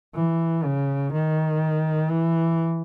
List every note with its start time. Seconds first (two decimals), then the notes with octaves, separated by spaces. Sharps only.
0.15 E3
0.64 C#3
1.13 D#3
2.11 E3